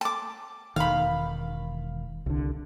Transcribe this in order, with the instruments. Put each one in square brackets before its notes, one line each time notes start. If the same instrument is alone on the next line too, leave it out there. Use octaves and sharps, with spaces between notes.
[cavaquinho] A5 D6
[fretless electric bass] E1 D#3 [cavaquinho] F5 B5
[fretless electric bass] C2 D3